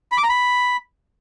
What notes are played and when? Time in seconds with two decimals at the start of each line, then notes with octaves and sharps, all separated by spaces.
0.12 B5
0.18 D6
0.23 A#5
0.29 B5